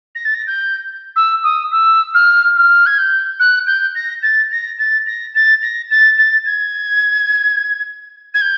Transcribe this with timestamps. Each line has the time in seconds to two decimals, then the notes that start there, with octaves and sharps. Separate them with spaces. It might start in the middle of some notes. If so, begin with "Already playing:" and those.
0.15 A#6
0.25 A6
0.34 A#6
0.47 G6
1.16 E6
1.43 D#6
1.72 E6
2.14 F6
2.56 F6
2.86 G#6
2.98 G6
3.39 F#6
3.67 G6
3.95 A#6
4.22 A6
4.51 A#6
4.78 A6
5.06 A#6
5.35 A6
5.62 A#6
5.91 A6
6.18 A6
6.46 G#6
8.34 G#6
8.41 G6